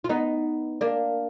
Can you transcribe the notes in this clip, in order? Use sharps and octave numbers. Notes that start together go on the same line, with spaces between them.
F4
B3 D#4
A#3 D4